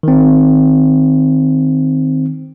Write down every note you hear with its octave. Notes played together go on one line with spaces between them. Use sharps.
D#3 C4